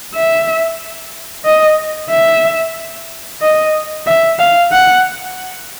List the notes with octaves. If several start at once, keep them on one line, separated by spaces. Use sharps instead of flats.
E5
D#5
E5
D#5
E5
F5
F#5